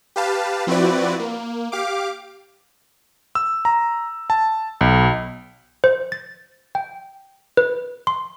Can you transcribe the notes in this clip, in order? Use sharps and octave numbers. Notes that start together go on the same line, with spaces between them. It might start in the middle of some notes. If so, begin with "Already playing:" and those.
G4 B4 F5 A5
F3 C4 E4 F#4 B4 D5
A#3
G4 F5 D6
E6
A#5
A5
B1
C5
A6
G5
B4
C6